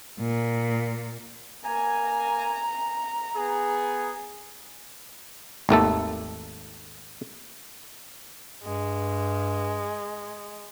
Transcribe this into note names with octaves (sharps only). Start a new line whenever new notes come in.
A#2
A#3 G#5 A#5
B3 G#4
G#1 D#2 A3 A4
G2 G#3